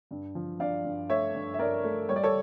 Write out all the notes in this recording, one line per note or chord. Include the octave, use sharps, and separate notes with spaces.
G2
F3
G2 D5 F5
G2
A3 C#5 E5
G2
E5
G2 A#4 D5
A3
G3 C#5
D5
A4 C#5